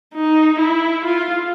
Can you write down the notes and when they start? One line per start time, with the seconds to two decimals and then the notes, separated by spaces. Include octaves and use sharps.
0.15 D#4
0.59 E4
1.04 F4